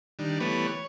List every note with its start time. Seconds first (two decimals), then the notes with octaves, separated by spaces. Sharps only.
0.19 D#3 G3 D4
0.40 E3 G3 A3 B3 B4 C#5
0.68 C#5